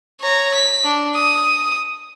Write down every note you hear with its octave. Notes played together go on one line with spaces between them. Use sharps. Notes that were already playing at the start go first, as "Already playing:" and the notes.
C#5 A#5
B6
D4
D#6